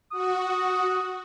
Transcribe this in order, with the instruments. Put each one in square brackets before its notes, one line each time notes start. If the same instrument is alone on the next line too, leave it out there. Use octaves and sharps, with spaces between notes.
[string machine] F#4 [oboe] D#6